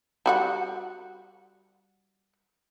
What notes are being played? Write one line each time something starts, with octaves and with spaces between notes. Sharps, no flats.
G3 F#4 F#5